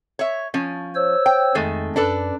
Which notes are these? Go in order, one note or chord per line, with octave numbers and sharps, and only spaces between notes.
C#5 E5
F3 C#4
C5 C#5 E6
G5
F2 D#3 G#3 A3
F#2 D4 A4 B4